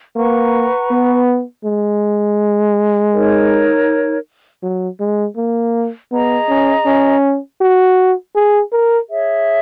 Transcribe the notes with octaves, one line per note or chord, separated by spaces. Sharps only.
A#3 B4 F#5 A#5 C#6
B3
G#3
D#4 A#4 C#5
F#3
G#3
A#3
B3 G#4 D#5 A#5
C#4
C#4
F#4
G#4
A#4
G#4 C#5 E5